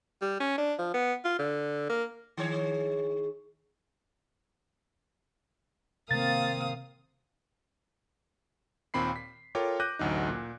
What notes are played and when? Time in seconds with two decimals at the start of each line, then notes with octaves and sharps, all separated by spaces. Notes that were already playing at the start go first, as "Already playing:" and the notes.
0.21 G3
0.40 C#4
0.58 D4
0.79 F3
0.94 B3
1.24 F4
1.38 D3
1.89 A#3
2.37 D#3 G#4 C#5
6.11 C3 D#3 A#3 C4 F5 D#6 A6
8.94 D#2 A#2 C4 B5 C7
9.16 B6
9.55 F4 A4 A#4 C#5 G5 D6
9.80 D6 F#6 G6 A#6 D#7
9.99 A1 D2 F#3 D#4
10.28 A#2